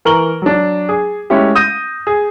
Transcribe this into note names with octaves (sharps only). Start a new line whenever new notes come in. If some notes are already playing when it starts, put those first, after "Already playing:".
E3 A#4 C#6 F#7 G7
F#3 D4
G#4
G#3 A3 C#4 E4 G4
D#6 G6 A#6 D#7
G#4